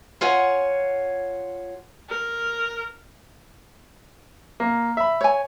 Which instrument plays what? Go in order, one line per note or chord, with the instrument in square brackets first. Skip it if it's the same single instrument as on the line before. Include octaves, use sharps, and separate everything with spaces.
[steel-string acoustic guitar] F4 C#5 F#5 G#5
[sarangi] A#4
[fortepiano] A#3
E5 B5
[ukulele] C#5 G#5